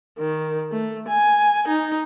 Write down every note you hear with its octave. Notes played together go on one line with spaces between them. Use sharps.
D#3
A3
G#5
D#4